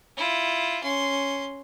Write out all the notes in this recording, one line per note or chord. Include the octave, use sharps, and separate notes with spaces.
E4 F4
C#4 C6